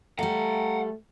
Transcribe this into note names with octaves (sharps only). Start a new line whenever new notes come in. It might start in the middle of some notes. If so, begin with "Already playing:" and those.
G3 A3 A4 F5 F#5 A#5